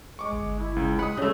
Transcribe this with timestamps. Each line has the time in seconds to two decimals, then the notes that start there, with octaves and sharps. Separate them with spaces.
0.19 G#3 C#6 D6
0.33 G1
0.59 E4
0.76 C#2
0.99 G#3 F#5 B5 D#6
1.17 C#3 G3 A3